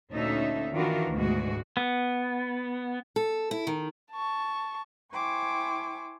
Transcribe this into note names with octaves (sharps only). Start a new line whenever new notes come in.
D2 A#2 C#4 D#4 A4 E5
D#3 E3 D4 F4 F#4 A#4
D2 G#2 B2 G#3 F#4
B3
A4
E4
D#3
A5 C#6
E4 C5 G5 G#5 C#6 D6